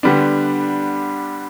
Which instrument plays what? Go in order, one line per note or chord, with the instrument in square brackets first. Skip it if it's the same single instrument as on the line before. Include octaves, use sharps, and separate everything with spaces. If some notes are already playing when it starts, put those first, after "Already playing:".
[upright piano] D3 G3 B3 D4